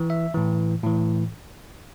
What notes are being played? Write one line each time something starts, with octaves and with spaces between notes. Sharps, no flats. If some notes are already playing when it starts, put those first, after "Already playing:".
Already playing: E3
E5
A2 E3
A2 E3